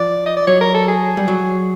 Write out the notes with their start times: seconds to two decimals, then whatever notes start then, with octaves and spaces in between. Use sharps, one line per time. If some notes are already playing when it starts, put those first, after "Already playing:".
Already playing: F3 D5
0.26 D#5
0.36 D5
0.47 F#3 C#5
0.61 A#4
0.74 A4
0.88 G#4
1.17 G3
1.28 F#3